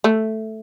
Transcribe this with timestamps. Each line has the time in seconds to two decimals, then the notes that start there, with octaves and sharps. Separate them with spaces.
0.04 A3